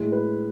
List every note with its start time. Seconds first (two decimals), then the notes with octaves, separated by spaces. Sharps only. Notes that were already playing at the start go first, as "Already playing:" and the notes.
Already playing: A2 G#3
0.12 B4